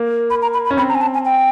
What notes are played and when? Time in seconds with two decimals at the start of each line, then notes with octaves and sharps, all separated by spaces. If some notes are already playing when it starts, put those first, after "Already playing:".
Already playing: A#3
0.30 B5
0.42 A#5
0.54 B5
0.65 B5
0.71 C#4
0.77 C4 B5
0.89 A#5
0.95 G#5
1.01 A5
1.14 G#5
1.25 G5